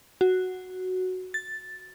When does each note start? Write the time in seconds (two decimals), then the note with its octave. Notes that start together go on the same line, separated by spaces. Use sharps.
0.21 F#4
1.34 A6